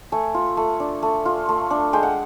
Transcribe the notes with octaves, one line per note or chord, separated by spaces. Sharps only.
A3 G#5
F4
A3
D4
A3
F4
A3
D4
G#3 G5
F#5